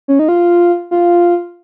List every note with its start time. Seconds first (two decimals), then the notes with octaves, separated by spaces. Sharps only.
0.08 C#4
0.19 D#4
0.29 F4
0.91 F4